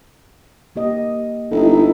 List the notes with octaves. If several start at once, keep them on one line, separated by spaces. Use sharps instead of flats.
A#3 G4 D#5
G1 D#4 E4 A4